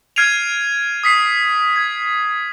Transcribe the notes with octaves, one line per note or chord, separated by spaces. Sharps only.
F6 G#6 C7 D7 D#7 F7
D#6 B6 C7
G#6